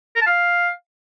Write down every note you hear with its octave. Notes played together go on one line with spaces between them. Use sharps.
A#4
A5
F5